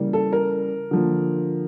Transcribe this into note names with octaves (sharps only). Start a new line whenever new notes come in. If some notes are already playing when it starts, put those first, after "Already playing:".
Already playing: C#3 E3 G3 A#3
A4
A#4
D3 F3 A#3